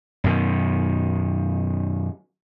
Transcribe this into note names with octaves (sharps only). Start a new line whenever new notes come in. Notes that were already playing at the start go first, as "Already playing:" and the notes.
F#2 B2 D#3